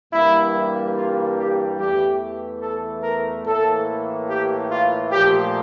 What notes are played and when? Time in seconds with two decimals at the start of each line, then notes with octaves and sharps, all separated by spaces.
0.11 G2 E3 G3 A#3 E4
0.95 F4
1.37 G4
1.78 E2 E3 A3 G4
2.61 A4
3.03 A#4
3.45 A2 E3 A#3 A4
4.28 G4
4.70 F4
5.11 A#2 F3 A3 G4